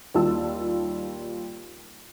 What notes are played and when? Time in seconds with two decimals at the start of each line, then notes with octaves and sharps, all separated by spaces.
0.14 D#2 G3 F4 A5 E6